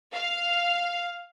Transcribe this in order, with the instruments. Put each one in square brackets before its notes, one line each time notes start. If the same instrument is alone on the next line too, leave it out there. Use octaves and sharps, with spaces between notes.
[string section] F5